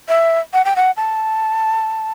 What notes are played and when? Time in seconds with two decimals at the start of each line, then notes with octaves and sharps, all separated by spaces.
0.09 E5
0.53 F#5
0.65 G5
0.76 F#5
0.97 A5